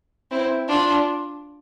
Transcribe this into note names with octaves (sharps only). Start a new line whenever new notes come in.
C4 E4
D4 F4